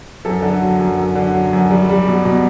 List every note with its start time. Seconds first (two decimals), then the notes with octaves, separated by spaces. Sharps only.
0.25 F#2 A4
0.42 D3
0.49 A4
0.62 F#3
0.80 F#2
0.98 F#2
1.15 D3
1.34 F#3
1.53 F#2
1.70 G3
1.89 G3
2.08 B2
2.25 B2